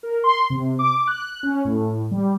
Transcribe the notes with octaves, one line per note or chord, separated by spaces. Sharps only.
A#4
C6
C3
D6
F#6
C#4
A2
G3